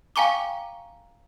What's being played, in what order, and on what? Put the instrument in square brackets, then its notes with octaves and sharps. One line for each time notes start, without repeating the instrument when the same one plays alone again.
[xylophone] F5 G5 G#5 A#5 C#6 D6